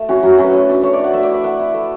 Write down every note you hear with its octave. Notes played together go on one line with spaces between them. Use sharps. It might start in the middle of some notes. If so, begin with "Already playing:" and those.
Already playing: A3
C#4 E4 F#4
F#3 F#4
C#4 E4
B4
A3
D4
A3 C#5
D5
D4
F#5
A3 E5
D5
E4 E5
A3 F#5
E4
A3